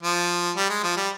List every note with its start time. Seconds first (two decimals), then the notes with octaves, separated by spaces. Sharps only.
0.03 F3
0.56 G3
0.69 G#3
0.83 F3
0.97 G3